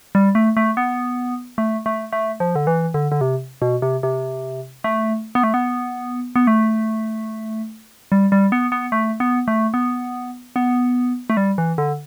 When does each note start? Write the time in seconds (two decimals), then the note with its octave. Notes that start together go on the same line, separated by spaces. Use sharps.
0.15 G3
0.35 A3
0.57 A3
0.77 B3
1.58 A3
1.86 A3
2.13 A3
2.40 F3
2.56 D3
2.67 E3
2.94 D3
3.12 D3
3.21 C3
3.62 B2
3.82 C3
4.03 C3
4.84 A3
5.35 B3
5.44 A3
5.54 B3
6.35 B3
6.47 A3
8.12 G3
8.32 G3
8.52 B3
8.72 B3
8.92 A3
9.20 B3
9.48 A3
9.74 B3
10.56 B3
11.30 A3
11.37 G3
11.58 E3
11.78 D3